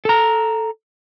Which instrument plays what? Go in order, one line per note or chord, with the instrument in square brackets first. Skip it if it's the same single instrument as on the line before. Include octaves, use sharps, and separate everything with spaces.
[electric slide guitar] A4 A#5